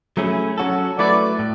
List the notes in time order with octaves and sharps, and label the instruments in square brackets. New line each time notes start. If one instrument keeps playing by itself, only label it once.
[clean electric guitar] F#3 A3 C#4 E4 G#4
F#3 C#4 F#4 A4
[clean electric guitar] F#3 A3 E4 B4 [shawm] D5
[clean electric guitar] A2